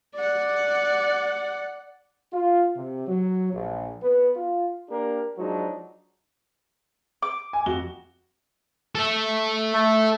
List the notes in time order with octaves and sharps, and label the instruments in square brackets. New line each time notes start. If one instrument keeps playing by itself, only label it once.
[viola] D5 F#5
[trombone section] F4
C3
F#3
A#1
B3
F4
A#3 D4 G4 A#4
F3 F#3 G#3 D4 D#4 F#4
[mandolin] D6
[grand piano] G#5
F2 F#4 G7
[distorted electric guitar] A4 E5
[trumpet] A3